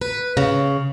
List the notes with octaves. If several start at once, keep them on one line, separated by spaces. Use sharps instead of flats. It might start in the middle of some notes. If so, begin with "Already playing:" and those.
B4
C#3